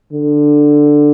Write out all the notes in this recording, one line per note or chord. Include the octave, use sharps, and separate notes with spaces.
D3